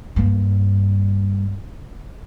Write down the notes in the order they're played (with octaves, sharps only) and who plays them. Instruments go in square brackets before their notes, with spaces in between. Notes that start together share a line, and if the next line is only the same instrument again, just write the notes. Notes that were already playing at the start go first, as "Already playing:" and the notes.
[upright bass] G2 A#3